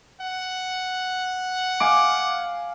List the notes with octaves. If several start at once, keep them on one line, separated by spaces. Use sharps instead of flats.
F#5
F5 G#5 D6